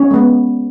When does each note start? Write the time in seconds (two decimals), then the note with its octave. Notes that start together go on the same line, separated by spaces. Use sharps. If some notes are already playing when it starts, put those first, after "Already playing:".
Already playing: C#4 C#5
0.11 G#3 B3